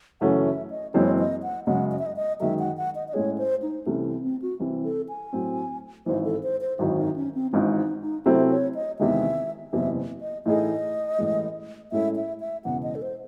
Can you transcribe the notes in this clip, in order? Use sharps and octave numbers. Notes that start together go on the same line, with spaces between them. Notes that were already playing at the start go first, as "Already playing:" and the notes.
F#2 C#3 E3 A3 C#4 F#5
E5
D#5
F#1 F#2 E3 G#3 C4 C#5
D#5
F#5
F#2 C#3 G#3 F#5
D#5
E5
D#5
D#5
F#2 D#3 G#3 E5
F#5
F#5
D#5
D#5
A2 G#3 C#4 G#4 C#5
C5
D#4
C2 C3 E3 A3 C#4
C4
C4
F#4
C2 C3 E3 C4
A4
G#5
A2 F#3 C4
G#1 G#2 E3 C5
A4
C5
C5
G#1 F#2 D#3 F#3 E4
D#4
C#4
C4
G#1 G#2 E3 C#4
D#4
D#4
C3 F#3 A3 C4 E4 C5
C#5
D#5
E2 C3 D#3 G#3 E5
F#1 E2 C3 E5
D#5
A2 E3 A3 D#4 G#4 D#5
A1 A2 E3 G#3
A2 G#3 C#4 E4 A4 E5
E5
E5
E1 E2 C#3 F#5
D#5
A4
C5